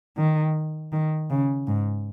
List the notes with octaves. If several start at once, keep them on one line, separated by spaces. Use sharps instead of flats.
D#3
D#3
C#3
G#2